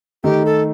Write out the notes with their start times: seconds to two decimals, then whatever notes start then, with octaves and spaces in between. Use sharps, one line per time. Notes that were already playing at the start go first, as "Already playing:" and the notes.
0.24 D#3 A3 D#4 G4
0.45 A4